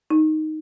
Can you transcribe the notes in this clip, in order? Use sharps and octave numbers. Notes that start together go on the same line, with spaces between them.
D#4